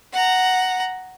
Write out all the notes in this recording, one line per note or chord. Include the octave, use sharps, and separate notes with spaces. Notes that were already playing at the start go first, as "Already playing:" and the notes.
F#5 A#5